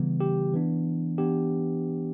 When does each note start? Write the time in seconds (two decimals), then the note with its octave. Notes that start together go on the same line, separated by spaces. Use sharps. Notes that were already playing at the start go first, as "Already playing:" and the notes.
Already playing: C#3 E3 G3 B3
0.20 G4
0.53 E3 B3 D4
1.18 E3 B3 D4 G4